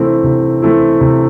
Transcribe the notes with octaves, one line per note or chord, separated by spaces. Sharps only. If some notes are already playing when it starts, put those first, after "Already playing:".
Already playing: C3 E3 A3 C4 E4
C3
E3 A3 C4 E4
C3